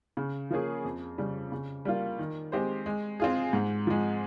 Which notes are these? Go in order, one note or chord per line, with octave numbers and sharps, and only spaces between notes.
C#3
F3 A#3 C#4 G#4
F2
C#3 G3
C#3
G3 A#3 F4
D#3
G#3 C4 G4 C5
G#3
C4 F4 G#4
G#2
F3 G#3